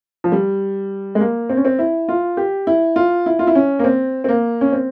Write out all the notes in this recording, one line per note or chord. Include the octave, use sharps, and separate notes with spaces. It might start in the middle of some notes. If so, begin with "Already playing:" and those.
F3
G3
G#3
A#3
C4
C#4
C4
E4
F4
G4
E4
F4
E4
F4
E4
C#4
A#3
C4
C4
A#3
C#4
C4